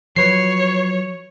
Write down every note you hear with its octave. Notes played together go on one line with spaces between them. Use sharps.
F3 F#3 B4 C#5 C7